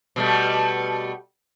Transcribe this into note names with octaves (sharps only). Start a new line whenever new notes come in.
B2 G3 A3